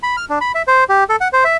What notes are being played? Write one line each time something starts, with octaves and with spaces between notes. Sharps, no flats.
B5
F6
D4
B5
E5
C5
G4
A4
F#5
C5
E5